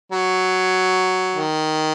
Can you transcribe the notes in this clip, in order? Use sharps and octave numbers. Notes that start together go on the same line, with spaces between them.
F#3
D#3